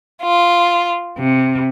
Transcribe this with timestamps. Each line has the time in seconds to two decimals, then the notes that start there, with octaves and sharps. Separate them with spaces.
0.22 F4
1.18 C3